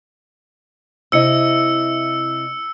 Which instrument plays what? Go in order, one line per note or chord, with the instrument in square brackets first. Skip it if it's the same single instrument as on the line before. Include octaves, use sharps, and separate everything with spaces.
[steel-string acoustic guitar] C3 E4 D#5 [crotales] E6 C#7